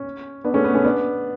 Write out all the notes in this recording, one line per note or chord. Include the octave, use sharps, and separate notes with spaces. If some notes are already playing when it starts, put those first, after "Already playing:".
Already playing: C#4
B3 D4
A3 C#4
B3
A3 C#4
B3 D4